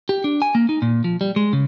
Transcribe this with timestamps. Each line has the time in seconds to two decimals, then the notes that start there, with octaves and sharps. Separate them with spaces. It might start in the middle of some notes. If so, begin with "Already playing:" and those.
0.09 G4
0.24 D4
0.42 G#5
0.55 A#3
0.69 D#4
0.82 A#2
1.04 F3
1.21 G3
1.36 G#3
1.53 C#3